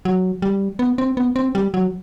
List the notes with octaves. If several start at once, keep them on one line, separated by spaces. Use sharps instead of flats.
F#3
G3
B3
C4
B3
C4
G3
F#3